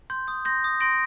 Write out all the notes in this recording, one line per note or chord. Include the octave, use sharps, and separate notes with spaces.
C6 G6
D#6 G6
C6 G6 A#6
D#6 G6
C6 A#6 D7